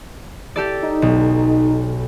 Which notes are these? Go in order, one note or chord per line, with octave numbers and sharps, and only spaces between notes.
G4 A4 D5
D#4
B1